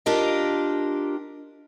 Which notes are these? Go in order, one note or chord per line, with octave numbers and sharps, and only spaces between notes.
D4 F4 G4 A#4 D#5